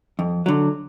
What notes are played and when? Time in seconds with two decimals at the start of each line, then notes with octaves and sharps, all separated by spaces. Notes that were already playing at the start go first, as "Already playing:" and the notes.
0.19 F2
0.46 D3 F#3